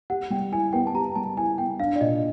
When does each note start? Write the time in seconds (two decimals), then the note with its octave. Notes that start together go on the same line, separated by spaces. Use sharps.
0.10 G4 F#5
0.30 G3 G5
0.52 E4 G#5
0.73 B3 G5
0.87 A5
0.95 G4 A#5
1.15 G3 A5
1.37 E4 G#5
1.58 B3 G5
1.80 D4 F5
1.96 D5
2.00 A#2 D#5